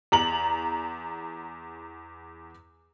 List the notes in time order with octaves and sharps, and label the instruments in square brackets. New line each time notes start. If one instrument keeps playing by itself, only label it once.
[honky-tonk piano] E2 A#5 F#7